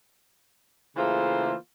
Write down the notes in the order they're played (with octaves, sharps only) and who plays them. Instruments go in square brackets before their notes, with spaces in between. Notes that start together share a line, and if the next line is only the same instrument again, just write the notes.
[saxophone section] C#3 E3 A3 A#3 F4 C5